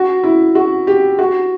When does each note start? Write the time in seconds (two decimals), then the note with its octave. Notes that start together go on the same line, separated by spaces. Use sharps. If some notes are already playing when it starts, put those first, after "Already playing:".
Already playing: F#4
0.23 E4
0.55 F#4
0.87 G4
1.18 F#4